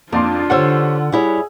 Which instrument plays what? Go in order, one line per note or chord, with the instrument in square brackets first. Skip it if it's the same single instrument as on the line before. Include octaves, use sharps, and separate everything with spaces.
[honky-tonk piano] F2 D5 C6 [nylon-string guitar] A#3 [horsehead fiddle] D4 F4
[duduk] D3 [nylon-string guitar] G4 C5 C#5 [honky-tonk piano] F#5 E6
[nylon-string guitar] G3 E4 C#5 [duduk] G#4